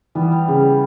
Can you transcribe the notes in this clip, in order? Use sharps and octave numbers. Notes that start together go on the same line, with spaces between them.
E3 G3 B3
G3
C#3 G3